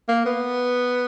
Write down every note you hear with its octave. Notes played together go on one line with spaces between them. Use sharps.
A#3
B3